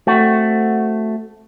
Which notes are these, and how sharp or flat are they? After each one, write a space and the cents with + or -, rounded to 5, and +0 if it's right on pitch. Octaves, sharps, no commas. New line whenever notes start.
A3 +0 C4 +0 F#4 +0